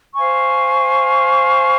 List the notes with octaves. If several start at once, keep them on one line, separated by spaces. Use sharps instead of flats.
C5 F5 G#5 C#6